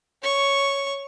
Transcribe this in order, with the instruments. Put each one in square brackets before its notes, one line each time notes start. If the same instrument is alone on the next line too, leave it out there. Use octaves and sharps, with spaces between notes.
[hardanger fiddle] C#5 C#6